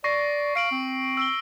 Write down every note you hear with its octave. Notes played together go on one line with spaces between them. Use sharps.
D5 C#6 A#6 C7
F5 C7 D7 F#7
C4
E6 D7 G7